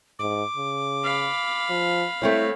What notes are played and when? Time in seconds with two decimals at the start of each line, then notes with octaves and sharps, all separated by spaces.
0.19 G#2 D6
0.56 C#3
1.04 F5 B5
1.70 F3
2.22 A3 C4 E4 C5 C#5